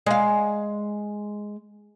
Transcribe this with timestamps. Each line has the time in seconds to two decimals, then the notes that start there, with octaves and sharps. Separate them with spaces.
0.06 G#3 F5